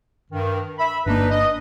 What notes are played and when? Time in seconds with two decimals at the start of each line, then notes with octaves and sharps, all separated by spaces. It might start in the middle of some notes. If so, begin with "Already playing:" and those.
0.31 G2 D#3
0.79 E5 B5
1.06 G1 A#3 D4 D#4 B4
1.31 D#5